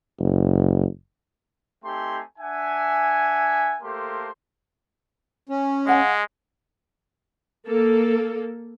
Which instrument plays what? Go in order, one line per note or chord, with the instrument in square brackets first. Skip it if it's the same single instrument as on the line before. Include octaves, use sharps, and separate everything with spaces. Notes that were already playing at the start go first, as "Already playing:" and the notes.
[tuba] F#1
[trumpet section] A3 C4 D#4 G4 G#5 C6
D4 E5 F#5 G#5
A3 A#3 G4 A4 C5 C6
[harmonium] C#4
[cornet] G#3 [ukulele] F5 F#5 G#5
[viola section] A#3 A4